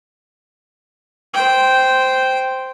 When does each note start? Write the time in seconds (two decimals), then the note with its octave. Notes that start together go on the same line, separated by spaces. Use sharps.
1.34 C5 G5